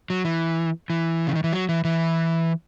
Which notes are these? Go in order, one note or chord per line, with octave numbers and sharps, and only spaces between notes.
F#3
E3
E3
C#3
D#3
E3
F#3
E3
E3